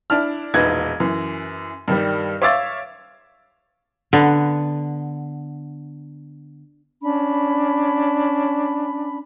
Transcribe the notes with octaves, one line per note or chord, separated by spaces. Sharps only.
D4 E4 A5 F6
E1 A#1 D#4 B4 G#6
F#2 E3
G2 D#3 G3
C#5 E5 F5 D6 E6 A6
D3 B3
C#4 D4 B5